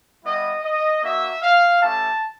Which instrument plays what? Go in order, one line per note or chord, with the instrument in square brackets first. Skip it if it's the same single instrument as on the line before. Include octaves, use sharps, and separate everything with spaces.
[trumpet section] G3 B3 E4 G4 D#5
D#5
A#3 D4 F#4 E5
F5
A3 C#4 E4 G4 A5